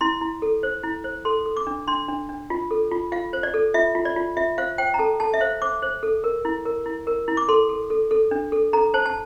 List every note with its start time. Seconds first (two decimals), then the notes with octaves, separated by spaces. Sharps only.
0.01 E4 C6
0.21 E4
0.42 A4
0.63 C5
0.83 E4
1.04 C5
1.25 A4 C6
1.46 A4
1.57 D6
1.67 D4
1.88 D4 C6
2.08 D4
2.29 D4
2.50 F4
2.71 A4
2.92 F4
3.12 F4 F5
3.33 C5
3.43 D5
3.54 A4
3.74 F4 E5
3.95 F4
4.05 D5
4.16 F4
4.37 F4 E5
4.58 C5 F5
4.78 C5 G5
4.94 A#5
4.99 A4 A5
5.20 A4 A5
5.34 E5
5.40 C5 F5
5.62 C5 D6
5.82 C5
6.03 A4
6.24 A#4
6.45 E4
6.65 A#4
6.86 E4
7.07 A#4
7.28 E4
7.37 D6
7.48 A4 C6
7.69 A4
7.90 A4
8.11 A4
8.31 D4
8.52 A4
8.73 A4 A#5
8.94 C5 A5
9.06 A5